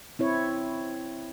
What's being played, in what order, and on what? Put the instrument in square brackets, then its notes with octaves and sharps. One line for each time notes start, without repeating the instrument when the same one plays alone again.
[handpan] C4 E4 C#5